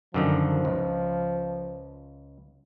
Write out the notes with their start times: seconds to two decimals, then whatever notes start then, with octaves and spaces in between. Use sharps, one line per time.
0.14 F#2 D3 D#3 F3
0.65 C#2